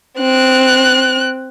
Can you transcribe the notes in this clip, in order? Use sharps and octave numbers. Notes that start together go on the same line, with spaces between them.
C4 F#6